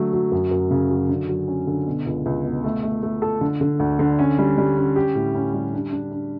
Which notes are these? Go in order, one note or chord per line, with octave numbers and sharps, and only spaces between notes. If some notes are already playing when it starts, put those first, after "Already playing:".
Already playing: D3 F#3 A3
F#3
F#2
F#2
C#3
F#3
D3
F#3
C#4
D3
B2
C#2
C#2
B2
A3
A3
A3
A4
D3
D3
D2
D3
C#4
G3
G3
C#4
G4
A2
C#4
G3
D4
D4
D4